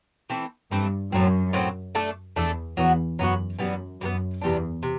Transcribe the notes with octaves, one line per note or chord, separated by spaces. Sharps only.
E3 A3 C4
G2 E3 A3 C4
F#2 A2 F#3 C4
A2 F#3 C4
A3 D4 A4
E2 A3 D4 A4
E2 F#3 B3 F#4
F#2 F#3 B3 F#4
F#2 E3 G3 B3
F#2 E3 G3 B3
E2 C3 G3 D4
C3